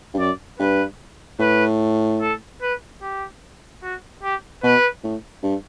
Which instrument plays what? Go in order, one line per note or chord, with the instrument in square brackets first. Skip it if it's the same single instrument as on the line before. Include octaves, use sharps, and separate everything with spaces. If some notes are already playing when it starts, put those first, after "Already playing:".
[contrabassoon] G2
[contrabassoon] F#2 [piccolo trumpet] D5
[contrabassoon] G2 [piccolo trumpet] B4
[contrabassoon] A2 [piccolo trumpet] B4
[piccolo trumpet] A4
B4
G4
F#4
G4
[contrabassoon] B2 [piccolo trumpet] B4
[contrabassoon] A2
G2